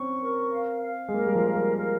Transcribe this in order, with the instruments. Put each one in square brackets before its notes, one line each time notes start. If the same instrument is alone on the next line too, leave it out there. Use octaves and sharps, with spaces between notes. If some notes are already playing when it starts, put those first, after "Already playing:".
Already playing: [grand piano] C4 C#4 [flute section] C#6
[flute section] A#4
F5
F5
[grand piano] G#3
[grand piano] A#3 [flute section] A#4
[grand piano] G3
F3
[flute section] F5
[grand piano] G3
[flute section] A#4